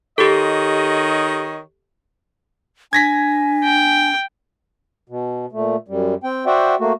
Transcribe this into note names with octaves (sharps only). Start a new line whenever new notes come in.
D#3 G4 A4 C#5 D#5
D4 G#5 G#6 A#6 B6
G5
B2
A#2 A3
F#2 G3
C4 G5
F#4 C5 D5 E5 F#5 G5
A3 A#3 F#4